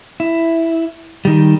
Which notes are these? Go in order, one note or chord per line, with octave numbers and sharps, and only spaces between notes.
E4
D#3 G3